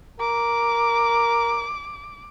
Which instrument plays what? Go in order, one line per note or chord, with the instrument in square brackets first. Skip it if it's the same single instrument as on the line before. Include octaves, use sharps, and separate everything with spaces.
[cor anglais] A#4 [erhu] D6